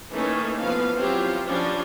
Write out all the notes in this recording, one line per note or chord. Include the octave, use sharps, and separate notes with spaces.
D#3 E3 A3 A#3 C#4 D#4
E3 F3 B3 B4 F5
F#3 C4 E4 F4 G4
F3 G3 C#4 D4